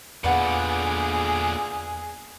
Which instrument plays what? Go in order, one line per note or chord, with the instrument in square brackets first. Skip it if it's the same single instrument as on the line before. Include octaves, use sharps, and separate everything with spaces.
[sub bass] E2 [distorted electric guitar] A#2 D3 [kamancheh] G#4 [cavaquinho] B4 D5 F#5